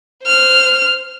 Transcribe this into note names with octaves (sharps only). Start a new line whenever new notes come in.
C5 F6